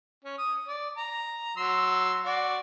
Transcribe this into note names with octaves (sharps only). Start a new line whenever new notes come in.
C#4
D#6
D5
A#5
F#3 C6 E6
F#4 D5